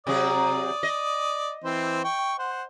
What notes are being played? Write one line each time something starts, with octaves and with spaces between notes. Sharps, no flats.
C3 F#3 G#4 D5 D#6
D#5
E3 C4 C5
G5 C#6
C5 F#5